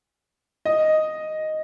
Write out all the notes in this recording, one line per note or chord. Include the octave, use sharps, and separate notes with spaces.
D#5